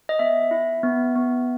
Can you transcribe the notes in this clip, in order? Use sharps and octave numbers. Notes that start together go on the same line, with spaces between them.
D#5
B3 E5
E4
B3
B3